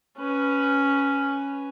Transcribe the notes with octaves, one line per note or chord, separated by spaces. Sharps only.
C#4 B4